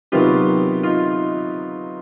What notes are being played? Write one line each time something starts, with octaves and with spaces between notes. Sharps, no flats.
C3 D#3 F#3 B3 F4 G4
D#4 F4